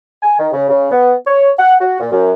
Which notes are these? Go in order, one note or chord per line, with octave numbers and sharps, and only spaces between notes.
G#5
D#3
C#3
C#3
B3
C#5
F#5
F#4
A#2
F#2